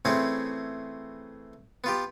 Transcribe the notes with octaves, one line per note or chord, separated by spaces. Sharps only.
E3 A3 C4 C#4 E4 G#4
B3 F4 G4